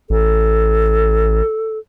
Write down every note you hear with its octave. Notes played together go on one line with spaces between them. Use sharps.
A1 A4